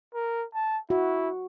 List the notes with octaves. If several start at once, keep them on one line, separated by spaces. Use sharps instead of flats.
A#4
A5
E4 F#4